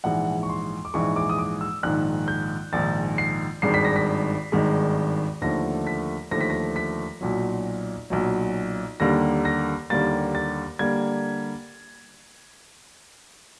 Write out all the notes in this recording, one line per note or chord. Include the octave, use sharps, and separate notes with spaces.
A#1 G#2 E3 G#3 F#5
C#6
C6
D6
A#1 G#2 E3 G#3 C#6
D6
D#6
D6
E6
A#1 G#2 D#3 F#6
G6
A#1 G#2 D#3 A6
C7
G#1 G2 D#3 G#3 C7
B6
A#6
B6
G#1 G2 D#3 G#3
D#2 D3 F3 A3 A#6
B6
D#2 D3 F3 A3 A#6
B6
A#6
B6
B1 A#2 F#3
B1 A#2 F#3
D#2 D3 G3 A#3 A#6
A#6
D#2 D3 G3 A#3 A6
A6
D3 G3 A#3 G#6